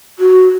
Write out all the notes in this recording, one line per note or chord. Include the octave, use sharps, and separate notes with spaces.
F#4